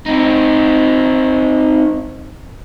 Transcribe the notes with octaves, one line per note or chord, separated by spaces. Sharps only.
C4 D#4